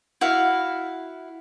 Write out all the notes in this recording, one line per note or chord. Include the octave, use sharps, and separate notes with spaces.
E4 F#4 F5